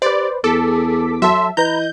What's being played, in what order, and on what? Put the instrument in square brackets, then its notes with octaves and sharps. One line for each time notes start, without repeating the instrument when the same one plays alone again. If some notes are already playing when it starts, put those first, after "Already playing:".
[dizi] G4 [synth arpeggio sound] B4 C5 [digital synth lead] D5
[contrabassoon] E2 [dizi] G#4 [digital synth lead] A4 [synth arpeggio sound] D6 B6
[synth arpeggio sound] F#3 A4 [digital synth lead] E5 [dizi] C6
[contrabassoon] E3 [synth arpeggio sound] B4 A#5 [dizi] D#5 [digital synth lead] G6